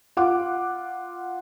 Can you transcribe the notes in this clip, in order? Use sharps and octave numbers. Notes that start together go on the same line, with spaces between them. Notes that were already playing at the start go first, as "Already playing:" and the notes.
F4 F#5 D6